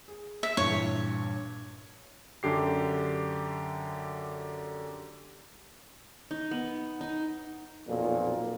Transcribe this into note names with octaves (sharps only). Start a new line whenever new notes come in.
G#4
E5
G2 A#2 E3 C#5
F#2 D3 G4 C7
D#4
B3
D#4
B1 F2 A#2